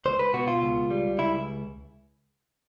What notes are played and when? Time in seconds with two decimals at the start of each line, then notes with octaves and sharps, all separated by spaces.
0.05 C#2 C5
0.19 B4
0.34 B2 F#4
0.48 F4
0.62 C#2
0.90 G3
1.18 C#2 E4